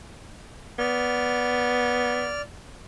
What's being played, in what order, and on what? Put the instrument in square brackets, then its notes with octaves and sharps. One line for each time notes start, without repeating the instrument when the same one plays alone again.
[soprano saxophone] B3 [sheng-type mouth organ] D5 F6